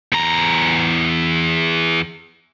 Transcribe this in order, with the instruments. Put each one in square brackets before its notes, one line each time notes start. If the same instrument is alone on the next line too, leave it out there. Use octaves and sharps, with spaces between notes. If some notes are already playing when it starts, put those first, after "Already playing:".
[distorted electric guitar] E2 A#5